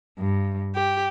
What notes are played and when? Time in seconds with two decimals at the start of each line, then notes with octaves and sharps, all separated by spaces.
0.19 G2
0.75 G4